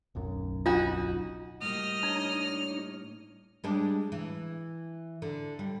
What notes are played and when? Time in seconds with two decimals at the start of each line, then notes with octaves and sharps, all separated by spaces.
0.15 D1 B1 F#2
0.66 D4 D#4 F4 F#4
1.62 A2 G3 A#3 D#5 F6
2.03 D4 D#4 C#5
3.64 G3 G#3 D4
4.12 E3
5.22 D3
5.59 G3